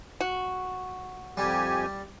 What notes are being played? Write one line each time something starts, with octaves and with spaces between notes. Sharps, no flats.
F#4
F2 G3 G4 G#5